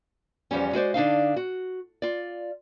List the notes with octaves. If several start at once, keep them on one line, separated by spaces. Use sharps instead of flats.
E2 F3 G3 C#4
G#3 F#4 C5 D5
D3 D4 D#4 F5
F#4
F4 D5